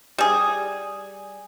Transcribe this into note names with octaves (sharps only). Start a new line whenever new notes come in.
G3 G#4